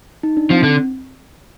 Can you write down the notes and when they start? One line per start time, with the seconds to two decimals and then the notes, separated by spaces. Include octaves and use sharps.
0.23 D#4
0.37 D4
0.50 F3 C4
0.63 D3